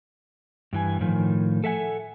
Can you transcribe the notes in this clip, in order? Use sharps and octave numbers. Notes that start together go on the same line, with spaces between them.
G2 E3 G#5
A2 D#3 F3
A4 E5 F#5 G#5